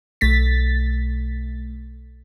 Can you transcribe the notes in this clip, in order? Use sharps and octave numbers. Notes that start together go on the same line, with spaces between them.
B1 A3 A6 B6